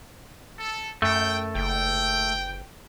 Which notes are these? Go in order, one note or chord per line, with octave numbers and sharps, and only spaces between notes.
A4
F#2 A3 G5
F#1 G5